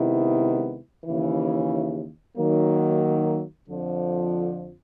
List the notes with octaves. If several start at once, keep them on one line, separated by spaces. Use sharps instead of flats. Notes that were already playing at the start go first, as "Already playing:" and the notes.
Already playing: C3 D#3 G#3 B3 E4
D#2 C#3 E3
D#3 F#3 A#3
F2 D3 F3